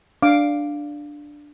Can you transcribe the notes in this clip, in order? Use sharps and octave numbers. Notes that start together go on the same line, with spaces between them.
D4 F5 D6